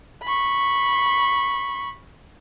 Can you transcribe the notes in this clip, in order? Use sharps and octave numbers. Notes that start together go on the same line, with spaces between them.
B5 C#6